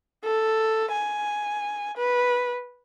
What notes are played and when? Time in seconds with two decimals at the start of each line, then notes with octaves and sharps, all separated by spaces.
0.24 A4
0.92 G#5
1.97 B4